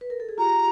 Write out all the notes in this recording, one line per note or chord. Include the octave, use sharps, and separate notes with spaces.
B4
A#4
A4
G#4
F4 G4 A#5